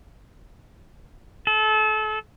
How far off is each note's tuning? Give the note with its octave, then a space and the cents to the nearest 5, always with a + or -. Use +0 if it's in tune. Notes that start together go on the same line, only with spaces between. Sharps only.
A4 -30